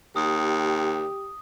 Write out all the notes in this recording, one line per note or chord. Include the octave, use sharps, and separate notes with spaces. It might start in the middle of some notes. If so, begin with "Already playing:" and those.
D#2 G4 D#6